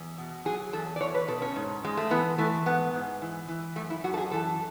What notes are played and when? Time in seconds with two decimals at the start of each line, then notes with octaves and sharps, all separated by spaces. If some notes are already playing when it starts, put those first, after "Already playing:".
Already playing: E2
0.17 B2
0.45 F#3 G#4
0.73 E2 A4
0.96 D5
1.01 E2 C#5
1.14 B4
1.28 B2 A4
1.42 C#4
1.56 G#2
1.83 G#2 G#3
1.97 A3
2.10 E3 B3
2.38 E3 A3
2.66 G#2 B3
2.94 G#2
3.22 E3
3.48 E3
3.76 F#2 A3
3.90 E4
4.04 F#2 F#4
4.14 A4
4.17 G#4
4.31 E3 A4